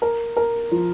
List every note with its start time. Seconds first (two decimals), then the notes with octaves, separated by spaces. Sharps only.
0.02 A#4
0.37 A#4
0.71 F3